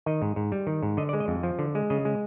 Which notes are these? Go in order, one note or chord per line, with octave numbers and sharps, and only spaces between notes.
D#3 D#5
G#2
G#2
G3
D#3
G#2
D3 D#5
D5
G#3
D#5
F2
F3
D3
G#3
C#3 D#5
G#3